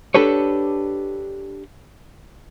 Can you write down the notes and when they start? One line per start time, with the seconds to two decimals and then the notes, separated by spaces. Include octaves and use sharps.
0.14 D4 G4 A4 B4 C#5